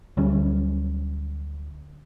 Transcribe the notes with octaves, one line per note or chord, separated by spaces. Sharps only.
D2 F#3 G3 C#4